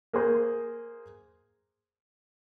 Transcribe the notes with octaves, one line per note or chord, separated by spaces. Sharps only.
A#3 G#4 C5